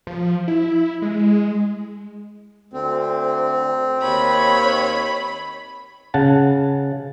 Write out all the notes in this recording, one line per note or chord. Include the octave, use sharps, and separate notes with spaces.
F3
E4
G#3
D2 C4
D#2 C#5 B5
C#3 F#5 A5